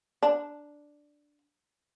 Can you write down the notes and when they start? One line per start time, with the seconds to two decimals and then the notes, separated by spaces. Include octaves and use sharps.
0.23 D4